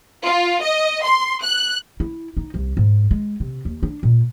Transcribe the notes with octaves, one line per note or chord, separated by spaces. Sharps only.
F4
D#5
C6
F#6
E4
D#4
C2
G#2
G#3
C3
D#2
D4
A#2